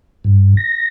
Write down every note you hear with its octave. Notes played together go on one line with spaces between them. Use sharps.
G2
A#6